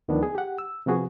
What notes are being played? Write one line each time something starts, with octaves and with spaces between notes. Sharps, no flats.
D2 D#3 F3 B3 D4
G#4
G4 F#5
E6
C3 F3 B3 F#4 G#4